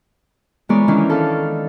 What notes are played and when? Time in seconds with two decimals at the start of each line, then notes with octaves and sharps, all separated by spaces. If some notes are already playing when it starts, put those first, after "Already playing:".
0.69 E3 G#3 B3 A#4 C#5 D5
0.88 D#3 E3 C#4 D4
1.10 A4 F5